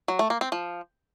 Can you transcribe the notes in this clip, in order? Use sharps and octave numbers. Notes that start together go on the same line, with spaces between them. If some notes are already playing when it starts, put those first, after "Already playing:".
F#3
A3
A#3
C4
F3